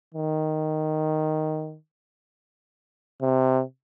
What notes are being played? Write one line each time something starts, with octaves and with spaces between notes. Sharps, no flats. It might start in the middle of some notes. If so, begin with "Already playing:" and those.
D#3
C3